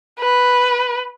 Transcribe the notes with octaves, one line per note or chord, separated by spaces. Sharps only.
B4